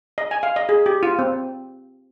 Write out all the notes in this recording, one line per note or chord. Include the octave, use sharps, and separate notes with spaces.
D#5
G#5
F5
D#5
G#4
G4
F4
C4